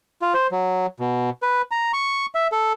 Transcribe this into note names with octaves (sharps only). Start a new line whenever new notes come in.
F4
C5
F#3
B2
B4
A#5
C#6
E5
A4